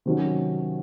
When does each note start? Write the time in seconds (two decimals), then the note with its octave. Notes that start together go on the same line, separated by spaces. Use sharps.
0.06 C3 D#3 F#3 C#4